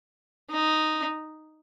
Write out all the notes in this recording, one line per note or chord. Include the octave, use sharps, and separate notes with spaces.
D#4